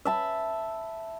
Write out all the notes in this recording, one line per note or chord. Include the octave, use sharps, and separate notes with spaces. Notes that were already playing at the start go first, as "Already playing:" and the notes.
E5 A5 B5